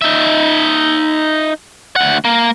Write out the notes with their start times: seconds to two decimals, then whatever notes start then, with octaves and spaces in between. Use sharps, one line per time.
0.02 D#4 E5
1.96 D2 F#5
2.25 A#3